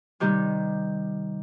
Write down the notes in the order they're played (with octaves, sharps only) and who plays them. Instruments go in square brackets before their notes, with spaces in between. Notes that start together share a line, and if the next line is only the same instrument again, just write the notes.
[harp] C3 D#3 G3 G4